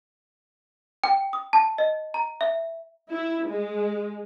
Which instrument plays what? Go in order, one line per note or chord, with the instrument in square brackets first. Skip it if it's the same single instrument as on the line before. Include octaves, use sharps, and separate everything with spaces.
[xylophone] G5
D#6
A5
D#5
A#5
E5
[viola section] E4
G#3